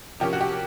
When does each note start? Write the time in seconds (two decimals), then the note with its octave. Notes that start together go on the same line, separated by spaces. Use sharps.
0.20 C3 F3 A#3 C#4 G4
0.33 F#4
0.41 G4